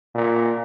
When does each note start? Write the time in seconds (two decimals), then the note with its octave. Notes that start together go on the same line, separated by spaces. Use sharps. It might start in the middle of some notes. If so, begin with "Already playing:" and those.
0.15 A#2